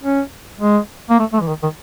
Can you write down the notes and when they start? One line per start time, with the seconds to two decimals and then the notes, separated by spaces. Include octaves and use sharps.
0.03 C#4
0.61 G#3
1.10 A#3
1.20 A3
1.33 A3
1.41 E3
1.48 D#3
1.63 D#3